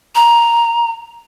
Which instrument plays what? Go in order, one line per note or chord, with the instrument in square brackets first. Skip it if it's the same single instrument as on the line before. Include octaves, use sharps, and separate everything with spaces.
[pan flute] A#5